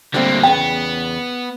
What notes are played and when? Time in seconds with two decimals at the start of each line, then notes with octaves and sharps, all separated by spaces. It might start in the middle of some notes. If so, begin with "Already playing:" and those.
0.14 D3 G3 A3 A#3 C4
0.43 E2 C#3 B3 G5